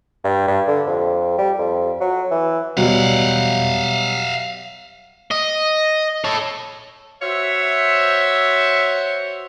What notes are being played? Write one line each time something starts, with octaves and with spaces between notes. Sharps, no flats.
G2
G2
D3
F2
G3
F2
F#3
E3
B2 F#3 G3 F5 F#5
D#5
A4 C#5
F#4 C5 C#5 E5